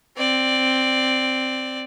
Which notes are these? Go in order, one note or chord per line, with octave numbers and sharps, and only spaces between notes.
C4 D5